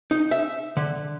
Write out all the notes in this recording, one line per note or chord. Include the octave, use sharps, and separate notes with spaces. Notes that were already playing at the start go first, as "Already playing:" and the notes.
D#4
E5
D3